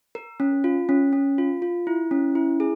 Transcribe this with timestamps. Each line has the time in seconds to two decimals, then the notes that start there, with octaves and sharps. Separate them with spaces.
0.15 A#4
0.40 C#4
0.64 F4
0.89 C#4
1.13 C#4
1.38 F4
1.62 F4
1.87 E4
2.11 C#4
2.35 E4
2.60 G#4